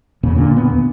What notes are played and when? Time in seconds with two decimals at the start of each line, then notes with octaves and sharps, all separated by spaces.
0.23 E1 E2 A#2 C#3
0.35 A#2 D3
0.57 B3
0.69 D#2